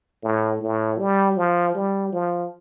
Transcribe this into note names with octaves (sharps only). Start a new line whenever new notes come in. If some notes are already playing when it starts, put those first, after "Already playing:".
A2
A2
G3
F3
G3
F3